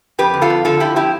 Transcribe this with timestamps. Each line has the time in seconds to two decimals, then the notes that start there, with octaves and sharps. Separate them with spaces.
0.18 F2 G4 B4
0.34 D3
0.41 F4 A4
0.50 F2
0.65 D3 F4 A4
0.80 F2 E4 G4
0.96 F3 E4 G4